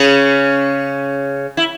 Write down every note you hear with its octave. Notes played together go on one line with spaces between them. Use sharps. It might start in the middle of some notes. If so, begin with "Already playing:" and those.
Already playing: C#3 C#4
E4